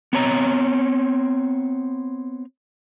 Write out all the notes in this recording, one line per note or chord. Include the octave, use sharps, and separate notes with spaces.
B3 C4 C#5 G#5 A#5